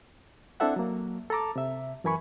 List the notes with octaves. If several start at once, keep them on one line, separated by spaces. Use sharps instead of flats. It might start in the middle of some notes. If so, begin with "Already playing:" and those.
C4 D4 E4 A4 E5 F#5
F#3 A#3
A4 A5 A#5 D6
C3 E5
F#2 E3 A#4 G#5 B5 C#6